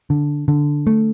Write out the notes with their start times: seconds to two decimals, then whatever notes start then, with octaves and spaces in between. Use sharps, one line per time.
0.10 D3
0.48 D3
0.87 A3